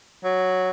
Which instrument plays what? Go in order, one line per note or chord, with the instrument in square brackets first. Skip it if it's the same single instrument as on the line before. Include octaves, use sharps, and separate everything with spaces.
[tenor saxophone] F#3